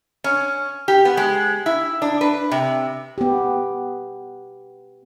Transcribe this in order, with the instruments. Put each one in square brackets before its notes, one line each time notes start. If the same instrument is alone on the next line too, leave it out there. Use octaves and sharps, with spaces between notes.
[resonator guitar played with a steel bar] C#4
G4
B3
G#3
E4
D4
B4
C3
[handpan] B3 G4